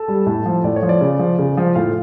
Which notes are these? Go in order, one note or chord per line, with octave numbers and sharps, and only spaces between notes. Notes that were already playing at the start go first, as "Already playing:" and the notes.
Already playing: A4 A5
G3
A2
F3
A2 D5
C#5
F3
D5
C#3
F3
C#3
F3
A2 F4 F5